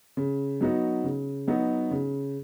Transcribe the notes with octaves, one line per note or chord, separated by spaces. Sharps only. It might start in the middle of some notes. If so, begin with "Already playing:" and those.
C#3
F#3 B3 D#4 F#4
C#3
F#3 B3 D#4 F#4
C#3